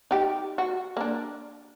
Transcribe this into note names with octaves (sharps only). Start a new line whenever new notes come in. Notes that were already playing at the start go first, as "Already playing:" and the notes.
D#4 G4
F#4
A#3 D4